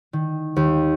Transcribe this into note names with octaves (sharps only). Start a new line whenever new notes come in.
D#3
D#2